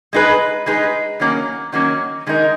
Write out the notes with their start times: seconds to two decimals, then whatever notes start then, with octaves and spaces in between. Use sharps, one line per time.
0.13 G#3 D#4 G#4 B4
0.66 G#3 D#4 G#4 B4
1.20 D#3 F#3 A#3 C#4
1.72 D#3 F#3 A#3 C#4
2.27 D#3 G#3 D#4 A#4